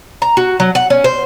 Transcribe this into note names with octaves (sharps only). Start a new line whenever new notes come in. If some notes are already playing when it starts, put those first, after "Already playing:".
A#5
F#4
F#3
F#5
C#4
C5